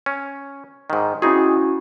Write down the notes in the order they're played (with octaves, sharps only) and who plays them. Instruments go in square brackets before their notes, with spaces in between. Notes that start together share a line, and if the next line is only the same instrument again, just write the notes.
[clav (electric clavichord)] C#4
G#2 D#3
[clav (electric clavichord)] C4 D#4 G#4 [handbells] C#4 E4 F#4